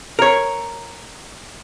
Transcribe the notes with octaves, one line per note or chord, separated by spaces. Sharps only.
A#4 C#5